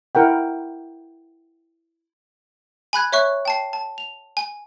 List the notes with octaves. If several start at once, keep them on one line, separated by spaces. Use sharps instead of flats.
E4 A#4 F#5 G5
G#5 B5 F#6 G#6
C#5 E5 C#6 F#6
G5 A5 C7
A5
F7
G#5